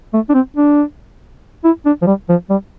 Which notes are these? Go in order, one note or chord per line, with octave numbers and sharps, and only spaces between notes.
A3
D4
C4
D4
E4
D4
F3
G3
F3
G3